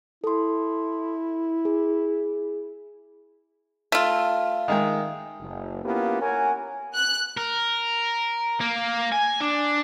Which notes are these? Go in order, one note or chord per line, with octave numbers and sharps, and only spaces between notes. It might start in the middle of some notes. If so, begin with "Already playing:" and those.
E4 A4 C6
G#4
A3 F4
D#3 G#3 G5
F#1
A#3 B3 C#4 E4 F4 G4
A#4 C#5 F#5 G#5
F#6
A#4
A#3
G#5
D4